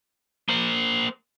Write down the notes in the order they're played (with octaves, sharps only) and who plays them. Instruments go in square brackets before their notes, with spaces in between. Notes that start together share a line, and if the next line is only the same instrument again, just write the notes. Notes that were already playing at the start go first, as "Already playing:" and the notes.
[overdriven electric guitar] A#3 C5